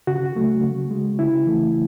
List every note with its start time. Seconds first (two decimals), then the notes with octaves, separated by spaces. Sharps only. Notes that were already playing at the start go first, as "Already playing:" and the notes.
0.07 C#3 F#4
0.35 F#3 A3
0.63 C#3
0.91 G#3
1.19 C#3 E4
1.47 E3 A3